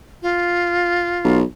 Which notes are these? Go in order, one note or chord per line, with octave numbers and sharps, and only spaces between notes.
F4
B1